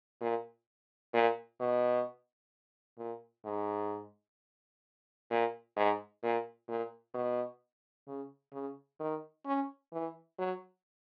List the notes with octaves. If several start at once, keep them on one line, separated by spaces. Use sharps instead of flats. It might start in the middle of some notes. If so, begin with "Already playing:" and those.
A#2
A#2
B2
A#2
G#2
A#2
G#2
A#2
A#2
B2
C#3
C#3
D#3
C#4
E3
F#3